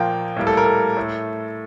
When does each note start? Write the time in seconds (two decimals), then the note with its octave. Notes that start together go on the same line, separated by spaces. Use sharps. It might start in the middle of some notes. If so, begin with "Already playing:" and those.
Already playing: A#2 F3 A#3 G5
0.37 A2 G3 A#3
0.47 A4
0.57 A#4
0.66 A4
0.97 A2 A3